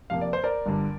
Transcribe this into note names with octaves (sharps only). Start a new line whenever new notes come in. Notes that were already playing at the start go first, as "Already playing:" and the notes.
F2 C3 A#3 F5
D5
C5
A#4 D5
G1 G2 D3 G3